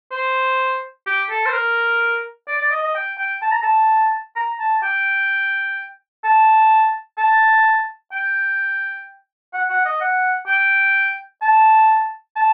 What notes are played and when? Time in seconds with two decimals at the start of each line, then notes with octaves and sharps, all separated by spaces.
0.11 C5
1.07 G4
1.30 A4
1.46 C5
1.53 A#4
2.47 D5
2.59 D5
2.71 D#5
2.83 D#5
2.95 G5
3.18 G5
3.42 A5
3.52 A#5
3.63 A5
4.36 A#5
4.60 A5
4.83 G5
6.24 A5
7.18 A5
8.12 G5
9.54 F#5
9.70 F#5
9.85 D#5
10.01 F#5
10.47 G5
11.42 A5
12.37 A5